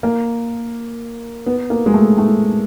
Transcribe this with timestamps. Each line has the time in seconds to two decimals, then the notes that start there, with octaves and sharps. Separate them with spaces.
0.03 A#3
1.46 B3
1.70 A#3
1.86 G#3
1.94 A3
2.18 A3